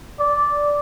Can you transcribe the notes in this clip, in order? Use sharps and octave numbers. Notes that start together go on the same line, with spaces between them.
D5